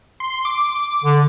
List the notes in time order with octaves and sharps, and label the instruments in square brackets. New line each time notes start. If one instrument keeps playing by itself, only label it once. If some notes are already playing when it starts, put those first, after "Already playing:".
[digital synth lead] C6
D6
[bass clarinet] D3